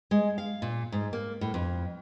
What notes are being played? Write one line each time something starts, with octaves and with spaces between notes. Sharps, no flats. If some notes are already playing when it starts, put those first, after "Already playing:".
G#3
F5
A#2
G#2
A#3
A2
F2